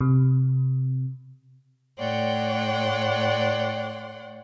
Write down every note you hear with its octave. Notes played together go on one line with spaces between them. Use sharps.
C3
A2 C#5 D5 F#5 G5 C6